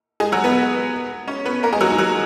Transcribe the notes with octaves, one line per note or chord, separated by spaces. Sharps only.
G#3 G#4
F#3 F#4
B3 B4
C#4 C#5
B3 B4
A#3 A#4
G#3 G#4
F#3 F#4
D#4
F#3 F#4